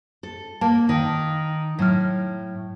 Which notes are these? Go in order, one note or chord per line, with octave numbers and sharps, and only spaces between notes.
A4
A#3 A5
D#3
A2 F#3 F6